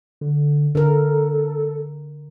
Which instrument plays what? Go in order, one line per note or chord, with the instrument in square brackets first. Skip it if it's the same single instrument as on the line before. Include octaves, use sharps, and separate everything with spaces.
[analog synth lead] D3
[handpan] D3 A#4 [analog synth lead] A4